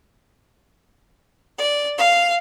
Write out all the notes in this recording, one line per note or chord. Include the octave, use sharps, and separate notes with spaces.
D5
F5